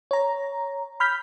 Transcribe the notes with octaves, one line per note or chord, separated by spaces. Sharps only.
C#5 A#5
B5 F6 G6 B6